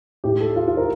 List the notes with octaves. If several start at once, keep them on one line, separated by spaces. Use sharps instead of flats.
A2 G4
A4
F4
F4
A#4